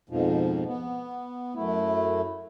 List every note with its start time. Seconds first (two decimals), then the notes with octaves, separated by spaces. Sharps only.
0.09 F2 G#2 B2 F3
0.67 B3
1.55 F#2 A3 E4